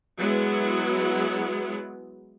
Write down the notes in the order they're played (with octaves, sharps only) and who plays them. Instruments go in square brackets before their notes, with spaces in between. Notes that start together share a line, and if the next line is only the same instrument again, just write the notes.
[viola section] F#3 G#3 B3 E4